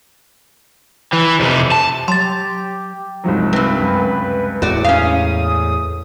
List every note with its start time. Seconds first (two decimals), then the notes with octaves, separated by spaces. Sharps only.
1.13 E3
1.39 F2 C3
1.72 A5
2.08 F#3 G4 C6 A6
3.24 C2 G#2 F3 F#3
3.53 G2 C3 B4
3.78 C#2 F#2
4.62 E2 A2 F#4 D5
4.84 C#4 F5 D#6